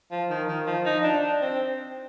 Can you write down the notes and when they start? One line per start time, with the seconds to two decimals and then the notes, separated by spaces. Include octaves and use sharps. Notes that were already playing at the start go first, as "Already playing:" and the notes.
0.11 F3
0.30 D#3
0.48 D#3
0.66 F3
0.85 D#4
1.03 D4
1.22 D4
1.41 C4